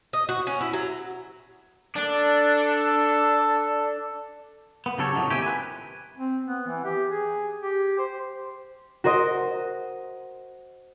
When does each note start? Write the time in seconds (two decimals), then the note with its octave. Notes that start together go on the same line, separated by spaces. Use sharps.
0.13 D#5
0.29 F#4
0.47 C#4
0.61 E4
0.73 F#3
1.96 D4 A4
4.86 B3
4.98 C#3 F#3 G4 A4 C#5
5.15 F2 A2 F#3 D#4
5.30 D#2 C3 C4 G4 G#5
5.42 B4 G#5
6.17 C4
6.45 B3
6.68 E3
6.84 G4
7.09 G#4
7.62 G4
7.98 C5
9.04 F#4 A#4 C5 D#5